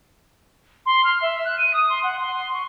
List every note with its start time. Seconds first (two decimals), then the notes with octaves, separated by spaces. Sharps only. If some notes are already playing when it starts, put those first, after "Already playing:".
0.86 C6
1.05 F6
1.22 E5
1.45 F#6
1.58 D#7
1.74 D#6
1.89 C6
2.03 F#5
2.20 C6
2.53 C#6